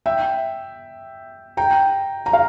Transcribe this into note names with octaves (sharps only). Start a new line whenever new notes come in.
E5 G5
G5 A#5
A#5
F5